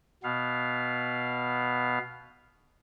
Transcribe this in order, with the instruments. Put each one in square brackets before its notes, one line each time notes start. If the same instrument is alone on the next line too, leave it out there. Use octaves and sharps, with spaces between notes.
[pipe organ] B2 B3 F5